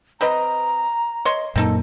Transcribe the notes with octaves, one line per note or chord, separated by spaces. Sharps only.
C4 B4 D#5 A#5
C#5 D#5 C6
F#2 A#2 A#3 C4 D#4 A4